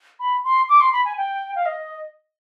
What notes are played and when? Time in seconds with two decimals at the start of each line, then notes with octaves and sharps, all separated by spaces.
0.20 B5
0.44 C6
0.69 D6
0.81 C6
0.93 B5
1.05 G#5
1.18 G5
1.56 F5
1.66 D#5